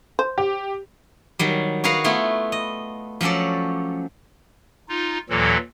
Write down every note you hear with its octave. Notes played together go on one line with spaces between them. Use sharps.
C5
G4
D#3 F#3 G3
F#4 G#4 A#4 B4 F5 F#5
A3 B3 E4 F4
D#5
F3 F#3 C#4 A4 D5
D#4 F4
D#2 A#2 E3 F#3 A4